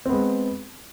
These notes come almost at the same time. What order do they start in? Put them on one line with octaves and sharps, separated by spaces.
C4 B3 G#3